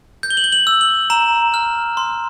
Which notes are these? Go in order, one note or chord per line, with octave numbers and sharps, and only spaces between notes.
G6
G7
F#7
G7
F#7
E6
F#7
A#5 E7
F6
C6